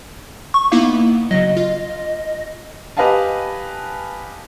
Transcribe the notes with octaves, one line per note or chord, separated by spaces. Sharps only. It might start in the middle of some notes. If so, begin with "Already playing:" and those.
C#6
A#3 B3 D#4 E4
C#3 F#3 D#5
F4
G4 B4 D#5 F5 G#5 A5